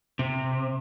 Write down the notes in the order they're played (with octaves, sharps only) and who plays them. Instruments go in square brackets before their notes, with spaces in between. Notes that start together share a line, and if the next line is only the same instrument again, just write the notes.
[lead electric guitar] C3